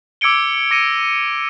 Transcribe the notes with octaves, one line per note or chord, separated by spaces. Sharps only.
D6 E6 G#6 C#7 D7 G7
D6 A#6 C#7 D#7